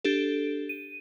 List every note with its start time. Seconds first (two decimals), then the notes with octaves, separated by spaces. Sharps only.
0.04 D4 G4 A4
0.69 D#7